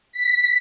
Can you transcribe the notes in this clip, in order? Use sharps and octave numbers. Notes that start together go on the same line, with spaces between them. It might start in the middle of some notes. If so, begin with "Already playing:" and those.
B6